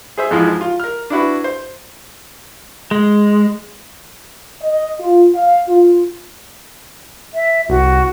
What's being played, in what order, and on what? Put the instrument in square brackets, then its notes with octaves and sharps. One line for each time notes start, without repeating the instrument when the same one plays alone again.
[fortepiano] G#4 C5 E5
F2 G#2 E3 F3 G#3
F4
A#4 F6
D4 E4 F#4 B4
C5
[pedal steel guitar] G#3
[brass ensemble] D#5
F4
F5
F4
[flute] E5
[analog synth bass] C2 [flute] F#4